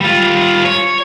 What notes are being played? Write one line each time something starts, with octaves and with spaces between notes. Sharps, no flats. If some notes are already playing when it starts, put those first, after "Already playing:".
G3 F4
C#5